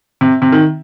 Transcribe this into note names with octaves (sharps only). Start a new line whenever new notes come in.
C3
C3
D#3